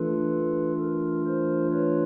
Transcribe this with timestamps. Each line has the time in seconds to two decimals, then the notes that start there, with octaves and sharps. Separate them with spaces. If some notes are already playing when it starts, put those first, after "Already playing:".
Already playing: E3 A3 D4 F4 A4 B4
0.81 A#4
1.26 A#4 C5
1.72 B4 C#5